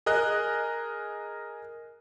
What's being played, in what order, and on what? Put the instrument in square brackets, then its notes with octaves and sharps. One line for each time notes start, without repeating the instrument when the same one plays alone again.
[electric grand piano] G#4 A#4 D#5 F#6